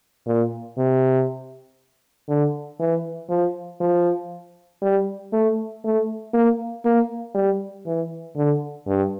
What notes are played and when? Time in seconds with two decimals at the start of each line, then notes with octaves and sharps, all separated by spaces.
0.27 A#2
0.77 C3
2.29 D3
2.80 E3
3.30 F3
3.81 F3
4.82 G3
5.33 A3
5.84 A3
6.34 A#3
6.85 A#3
7.35 G3
7.86 E3
8.36 D3
8.87 G2